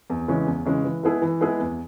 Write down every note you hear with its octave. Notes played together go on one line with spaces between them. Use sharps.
E2
C#3 E3 G#3 C#4
E2
C#3 E3 G#3 C#4
E3
G#3 B3 E4 G#4
E3
G#3 B3 E4 G#4
E2